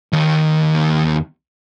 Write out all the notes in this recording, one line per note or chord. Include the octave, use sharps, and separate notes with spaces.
D#2 D#3